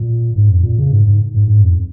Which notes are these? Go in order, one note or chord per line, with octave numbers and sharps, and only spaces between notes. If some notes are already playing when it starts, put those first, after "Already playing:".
Already playing: A#2
G#2
F2
A#2
C#3
G#2
G#2
G#2
G#2
F2